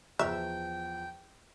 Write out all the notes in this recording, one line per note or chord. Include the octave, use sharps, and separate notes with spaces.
E2 F3 E5 G5